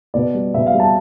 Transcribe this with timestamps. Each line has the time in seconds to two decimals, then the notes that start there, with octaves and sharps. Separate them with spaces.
0.14 B2 D5
0.34 G3
0.54 B2 E5
0.66 F5
0.74 G3
0.80 A5